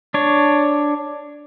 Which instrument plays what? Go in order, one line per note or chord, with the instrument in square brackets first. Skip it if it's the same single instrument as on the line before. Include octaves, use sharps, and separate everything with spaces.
[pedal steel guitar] D4 C#5